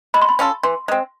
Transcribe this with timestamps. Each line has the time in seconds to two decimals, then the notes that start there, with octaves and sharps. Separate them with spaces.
0.14 G#3 B5
0.22 C6
0.29 B5
0.39 C#4 F4 A4
0.63 E3 C6
0.88 G#3 C4